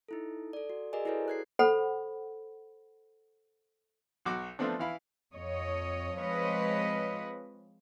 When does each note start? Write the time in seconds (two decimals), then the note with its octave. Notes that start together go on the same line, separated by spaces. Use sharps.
0.08 D#4 E4 A4
0.53 A4 D5
0.70 F#4
0.93 F#4 G#4 A#4 D5 D#5 G#5
1.05 E4 F#4 G#4 A4 B4 C#5
1.28 F#6 G#6 C7
1.59 A4 C5 F#5 B5
4.25 B1 F#4 D6
4.59 F3 A3 B3 C4 D4
4.79 E3 E4 F5 B5
5.34 F2 C#5 D#5
6.20 F3 G#3 C4 B4 C#5 D#5